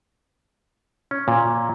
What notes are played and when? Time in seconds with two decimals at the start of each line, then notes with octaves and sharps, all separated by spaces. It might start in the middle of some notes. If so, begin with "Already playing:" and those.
1.11 C#4
1.28 A#2